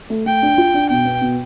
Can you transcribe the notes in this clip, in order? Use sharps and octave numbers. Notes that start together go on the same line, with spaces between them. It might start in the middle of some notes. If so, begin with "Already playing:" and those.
A3
A3 G5
D4
F4
D4
B2 G5
B3
B2